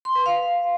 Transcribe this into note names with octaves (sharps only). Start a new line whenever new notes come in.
C6
B4
F5